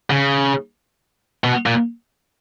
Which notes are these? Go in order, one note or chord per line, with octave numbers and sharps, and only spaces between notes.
C#3
B2
A#2